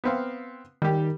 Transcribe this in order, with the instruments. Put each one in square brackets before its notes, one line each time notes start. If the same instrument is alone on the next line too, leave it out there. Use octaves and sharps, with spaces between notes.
[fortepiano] B3 C4 F5
[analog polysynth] D#3 [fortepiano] G3 G4